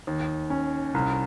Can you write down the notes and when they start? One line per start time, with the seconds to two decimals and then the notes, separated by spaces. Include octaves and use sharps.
0.07 D#2
0.50 C#4
0.94 C2